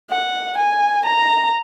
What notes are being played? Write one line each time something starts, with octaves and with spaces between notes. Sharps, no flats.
F#5
G#5
A#5